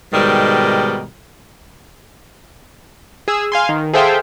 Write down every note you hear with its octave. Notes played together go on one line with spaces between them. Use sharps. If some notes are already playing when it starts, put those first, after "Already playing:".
G#2 B2 D#3 G3
G#4 E6
F5 G#5 C6
D#3
G#4 A4 C5 E5 F5 G5